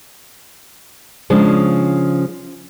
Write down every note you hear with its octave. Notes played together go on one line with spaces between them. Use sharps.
C#3 F3 G#3 C#4 D4